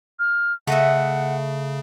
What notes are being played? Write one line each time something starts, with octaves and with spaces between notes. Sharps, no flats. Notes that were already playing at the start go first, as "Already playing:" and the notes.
F6
C#3 A3 D#5 E5 F#5